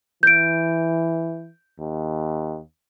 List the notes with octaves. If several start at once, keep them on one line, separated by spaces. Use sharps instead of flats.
E3 G6 D7
D#2